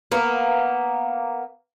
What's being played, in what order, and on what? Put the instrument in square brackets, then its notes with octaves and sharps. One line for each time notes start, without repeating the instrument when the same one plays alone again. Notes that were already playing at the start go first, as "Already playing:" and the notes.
[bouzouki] A#3 B3